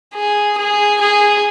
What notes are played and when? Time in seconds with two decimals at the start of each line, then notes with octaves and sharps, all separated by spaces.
0.15 G#4
0.58 G#4
1.01 G#4